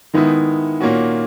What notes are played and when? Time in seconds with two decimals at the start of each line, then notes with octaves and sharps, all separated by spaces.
0.14 D#3 G#3 B3 E4
0.80 A#2 A#3 C#4 F#4